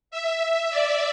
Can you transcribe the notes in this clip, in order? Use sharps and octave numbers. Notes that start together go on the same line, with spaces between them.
E5
D5